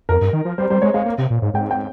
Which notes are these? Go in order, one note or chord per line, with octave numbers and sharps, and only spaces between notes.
F2 A#4
G2
D#3
F3
G3 C5
G3 C5
G#3 C#5
G#3 F5
A#3
C3
A#2
G#2
G#2 G5
G5